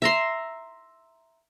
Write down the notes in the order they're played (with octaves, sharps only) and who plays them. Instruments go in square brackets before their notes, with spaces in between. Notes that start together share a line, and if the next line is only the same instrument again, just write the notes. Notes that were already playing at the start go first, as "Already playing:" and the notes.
[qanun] E5 A#5 C6